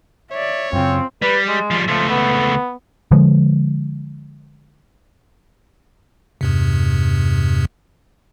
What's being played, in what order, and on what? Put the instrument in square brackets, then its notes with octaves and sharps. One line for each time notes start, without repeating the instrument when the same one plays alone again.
[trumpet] C#5 [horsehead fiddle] D5 E5
[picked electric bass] F#2 C#3 [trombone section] C4 [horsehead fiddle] C#4 F4
[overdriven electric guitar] G3 [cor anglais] B4
[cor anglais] G#3
[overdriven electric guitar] F3 G3
[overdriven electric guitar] C#2 A3 [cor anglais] F3
[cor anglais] B3
[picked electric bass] D3 F3 G#3
[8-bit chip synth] E2 G2 C3